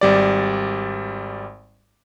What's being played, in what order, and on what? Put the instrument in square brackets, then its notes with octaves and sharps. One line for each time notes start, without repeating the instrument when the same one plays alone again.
[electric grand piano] G#1 G3 D5